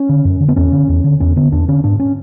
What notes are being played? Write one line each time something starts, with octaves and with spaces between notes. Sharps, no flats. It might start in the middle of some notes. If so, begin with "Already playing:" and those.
Already playing: C#4
D3
F#2
D3
B3
E2 C#4
D3
E2
D3
E2 C#4
D3 B3
E2 D4
D3 C#4
G#2 D4
C#4